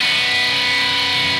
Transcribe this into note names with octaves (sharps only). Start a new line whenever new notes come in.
F#2 B3